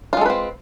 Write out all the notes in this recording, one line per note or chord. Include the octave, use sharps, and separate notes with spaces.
G#3 C4 F4 A4 B4